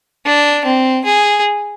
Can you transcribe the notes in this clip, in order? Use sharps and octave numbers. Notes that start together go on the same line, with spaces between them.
D4
C4
G#4